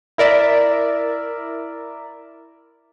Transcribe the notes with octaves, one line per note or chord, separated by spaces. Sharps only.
E4 A#4 D5 E5